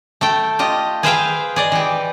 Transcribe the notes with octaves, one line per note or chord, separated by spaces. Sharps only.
A3 A4 G5
F4 G4 D#5
G#4 B4 C5 E5 F5 G5
G#4 D5 D#5
E3 G4